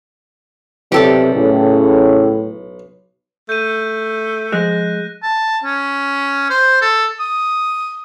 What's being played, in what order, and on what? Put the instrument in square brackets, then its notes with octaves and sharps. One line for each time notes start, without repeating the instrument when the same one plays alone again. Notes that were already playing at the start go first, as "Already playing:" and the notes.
[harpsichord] B1 [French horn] C3 [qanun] G4 A4 D5
[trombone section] A2 [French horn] C#3
[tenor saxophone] A3 [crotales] G6 D#7
[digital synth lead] F3 [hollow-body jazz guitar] G#3 [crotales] F#6 A#6
[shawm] A5
C#4
C5
A4
D#6